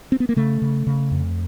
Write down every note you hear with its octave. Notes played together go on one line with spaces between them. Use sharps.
C4
B3
A#3
C#3 A3
C#3
C#3
F2